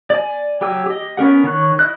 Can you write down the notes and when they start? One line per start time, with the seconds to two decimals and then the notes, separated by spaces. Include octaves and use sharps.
0.10 D5 G#5
0.61 F#3 G4 G5 G#5 E6
0.86 G4 D#5
1.17 B3 C#4 A#4 F#5
1.44 D#3 C#5 F#6
1.79 E4 D#5 F#6